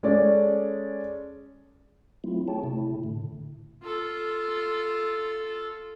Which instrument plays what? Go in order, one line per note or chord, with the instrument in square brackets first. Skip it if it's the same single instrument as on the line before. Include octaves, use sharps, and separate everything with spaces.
[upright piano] G#3 C#4 A4 C#5 D5
[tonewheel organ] F#3 A3 C4 E4 F4
G#4 C#5 G5 A5
C3 A3 E4
A2 D3
[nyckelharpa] F4 A4